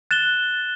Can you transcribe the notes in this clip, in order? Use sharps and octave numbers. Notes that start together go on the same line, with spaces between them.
F#6 A6 E7 G7